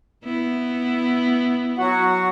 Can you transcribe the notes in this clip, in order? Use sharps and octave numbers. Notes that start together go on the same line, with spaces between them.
B3 E4
F#3 F#4 F#5